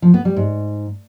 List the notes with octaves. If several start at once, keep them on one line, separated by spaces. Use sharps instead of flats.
F3
B3
G3
G#2